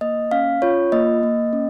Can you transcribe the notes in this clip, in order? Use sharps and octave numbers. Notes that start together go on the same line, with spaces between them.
A#3 D#5
C#4 F5
F4 C#5
A#3 D#5
A#3
C#4